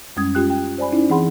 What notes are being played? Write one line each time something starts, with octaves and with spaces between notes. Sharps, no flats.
F#2 G3 G#3 C#4 D#6 G#6
C#4 F4 G4 G5 F#6
G5
C5 D5 G#5 B5
C#4 D#4 E4
E3 C4 G#4 F#5 B5 C6